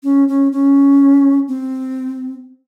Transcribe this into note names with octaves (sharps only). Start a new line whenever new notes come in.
C#4
C#4
C#4
C4